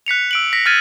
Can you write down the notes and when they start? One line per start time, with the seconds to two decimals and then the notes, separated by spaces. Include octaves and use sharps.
0.06 F#6 B6 C#7 F7
0.31 E6 D7 F#7
0.53 A#6 B6
0.66 F6 F#6 G#6 A6 D#7